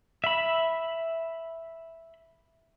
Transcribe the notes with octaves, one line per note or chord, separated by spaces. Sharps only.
E5 B5